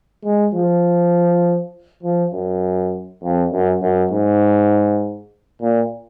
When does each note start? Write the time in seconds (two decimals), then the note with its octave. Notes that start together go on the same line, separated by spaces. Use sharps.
0.24 G#3
0.54 F3
2.03 F3
2.33 F#2
3.22 F2
3.52 F#2
3.82 F#2
4.11 G#2
5.61 A#2